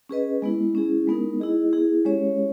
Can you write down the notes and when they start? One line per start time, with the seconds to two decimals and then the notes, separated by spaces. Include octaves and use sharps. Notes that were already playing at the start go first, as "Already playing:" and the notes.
0.09 C#4 G#4 B4 D#5
0.42 G#3 B3 E4
0.75 C#4 E4 G#4
1.07 G#3 B3 D#4 A#4
1.40 E4 G#4 D#5
1.73 B3 E4 G#4
2.05 G#3 C#4 G4 C#5